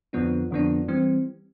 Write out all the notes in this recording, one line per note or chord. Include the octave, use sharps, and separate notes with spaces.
F2 D3 F3 B3 D4
F2 D3 F3 B3 D4
E3 G3 C4